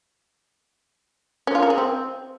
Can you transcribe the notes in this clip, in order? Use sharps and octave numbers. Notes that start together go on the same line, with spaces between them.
C#4
F4
A#4
G#4
C4